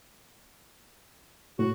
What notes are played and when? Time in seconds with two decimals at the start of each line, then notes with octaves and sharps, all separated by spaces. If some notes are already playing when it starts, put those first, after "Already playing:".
1.59 A2 F#4